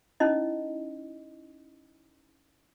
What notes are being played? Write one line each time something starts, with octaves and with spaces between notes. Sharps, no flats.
C#4 D#4 E4 D#5